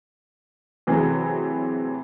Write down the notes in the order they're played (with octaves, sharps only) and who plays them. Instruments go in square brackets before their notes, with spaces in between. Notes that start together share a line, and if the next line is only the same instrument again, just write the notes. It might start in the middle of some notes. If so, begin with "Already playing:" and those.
[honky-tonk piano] C3 E3 F#3 A3 G#4 B4